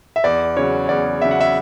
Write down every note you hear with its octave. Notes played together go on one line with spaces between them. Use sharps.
E5
E2 D5
C#3 F#3 C#5
E2 D5
C#3 F#3 E5
F#5
E5